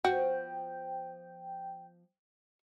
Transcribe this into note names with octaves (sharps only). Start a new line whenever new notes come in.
F3 B3 F#4 G5